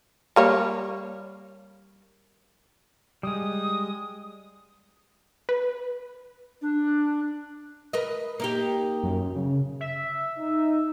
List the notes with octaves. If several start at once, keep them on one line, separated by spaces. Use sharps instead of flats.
G3 A#3 C#5
G3 G#3 D#6
B4
D4
A#4 B4 D#5
A#3 D#4 G4
F#2
C#3
E5
D#4